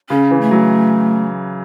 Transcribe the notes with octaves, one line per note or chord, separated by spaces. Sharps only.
C#3 C#4
E3
A3
F#3